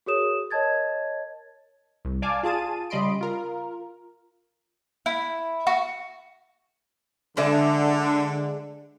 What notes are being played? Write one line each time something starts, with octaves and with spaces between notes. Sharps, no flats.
F#4 G#4 A#4 C#5 D#6 E7
A#4 C#5 D#5 A5 G#6 A6
C2
D5 F5 G#5 A5 D6
F4 G#4 A5 D#7
C#3 G3 D#5 B5 C6 D7
F4 A#4
E4
F#4
D3 G#3 D4 E5